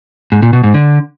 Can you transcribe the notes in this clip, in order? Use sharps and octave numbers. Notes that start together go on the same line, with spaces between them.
G#2
A#2
B2
G#2
D3